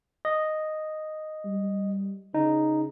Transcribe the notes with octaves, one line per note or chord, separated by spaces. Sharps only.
D#5
G3
C#3 D#4